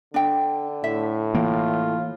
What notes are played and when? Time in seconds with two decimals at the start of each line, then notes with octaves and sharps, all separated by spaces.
0.14 D3 D4 G5
0.84 A2 E5
1.35 E3 A#3 F4